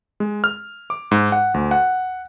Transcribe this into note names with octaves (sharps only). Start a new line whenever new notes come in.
G#3
F6
D6
G#2
F#5
D2
F#5